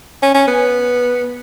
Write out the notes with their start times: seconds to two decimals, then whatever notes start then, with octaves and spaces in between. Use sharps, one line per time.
0.23 C#4
0.34 C#4
0.48 B3